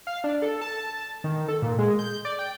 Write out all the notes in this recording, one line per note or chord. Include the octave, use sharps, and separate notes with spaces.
F5
D4
A4
A5
D#3
A4
A#2
G#3
G6
D5
G5